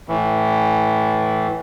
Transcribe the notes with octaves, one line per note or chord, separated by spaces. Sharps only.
A2 E3